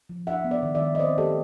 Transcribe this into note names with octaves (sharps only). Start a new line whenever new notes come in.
F3
D4 E5 F#5
B3
D5 E5
D#3
D5 E5
G#3
D#5
C4 C5 D5
A3 G4 A4